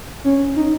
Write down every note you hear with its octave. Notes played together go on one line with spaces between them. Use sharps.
C#4
D#4